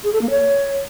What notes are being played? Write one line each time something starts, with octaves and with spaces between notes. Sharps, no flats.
G#4
A4
A#3
C#5